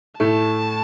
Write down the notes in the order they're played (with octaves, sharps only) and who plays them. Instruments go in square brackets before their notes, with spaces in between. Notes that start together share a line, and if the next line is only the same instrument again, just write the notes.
[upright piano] A2 A3 [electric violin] A5